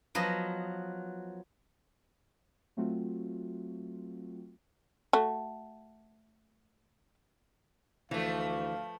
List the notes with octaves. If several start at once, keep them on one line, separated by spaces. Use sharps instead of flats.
F3 F#3 B3 D#5
F#3 A3 C4 F4 F#4
A3 F#4
D2 E3 F3 A3 F5